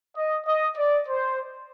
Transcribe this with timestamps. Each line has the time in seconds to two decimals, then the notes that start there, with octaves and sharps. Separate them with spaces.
0.16 D#5
0.46 D#5
0.76 D5
1.07 C5